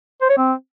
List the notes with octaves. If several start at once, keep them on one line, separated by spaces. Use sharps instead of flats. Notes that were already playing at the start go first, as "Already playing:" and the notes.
C5
C#5
C4